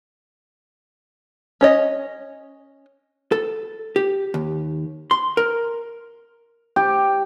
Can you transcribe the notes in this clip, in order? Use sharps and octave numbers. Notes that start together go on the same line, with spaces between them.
C#4 C#5 D#5
A4
G4
D#2
C6
A#4
G4